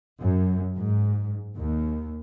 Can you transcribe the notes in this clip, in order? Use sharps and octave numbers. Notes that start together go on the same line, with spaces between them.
F#2
G#2
D#2